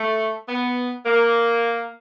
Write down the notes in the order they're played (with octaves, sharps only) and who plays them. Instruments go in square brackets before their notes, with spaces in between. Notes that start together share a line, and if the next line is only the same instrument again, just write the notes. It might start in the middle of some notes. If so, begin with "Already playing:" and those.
Already playing: [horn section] A3
B3
A#3